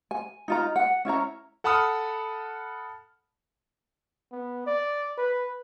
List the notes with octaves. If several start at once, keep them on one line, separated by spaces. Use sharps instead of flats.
G#5
D#4 F4 A#5
F#5
C#4 E4 C#5 A#5
A4 F#5 A5 B5 D#6 F6
B3
D5
B4